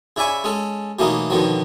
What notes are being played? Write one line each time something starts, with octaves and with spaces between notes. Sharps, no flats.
C#3 E4 D5 E5 G#5 C#6
G#3 C#4 A4
B2 E3 F#3 A3 A#3 D#4
F2 B2 D3 D#3 F3 F#3